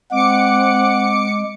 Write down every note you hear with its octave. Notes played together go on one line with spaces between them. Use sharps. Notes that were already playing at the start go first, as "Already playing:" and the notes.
G#3 C4 F#5 D6 C#7